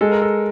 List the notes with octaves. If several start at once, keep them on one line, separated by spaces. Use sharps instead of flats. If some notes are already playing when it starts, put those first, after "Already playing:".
G#3 A4
A#4
A4